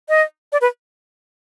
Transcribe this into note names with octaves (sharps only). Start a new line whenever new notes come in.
D#5
D5
B4